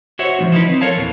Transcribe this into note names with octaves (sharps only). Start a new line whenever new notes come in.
F#4 C5 C#5 E5 F#5
F3 G3 D#4
F3 D#4 E4 B4
C4
A4 A#4 C#5 F5 A5
E2 A#2 E3 B3